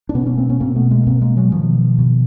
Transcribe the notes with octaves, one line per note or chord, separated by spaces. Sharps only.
D4
B2 B3 C#4
B3 C#4
A#3 C4
B3 C#4
B2 A#3 C4
A3 B3
G#3 A#3
B2 A#3 C4
G#3 A#3
F#3 G#3
B2 D#3 F3
B2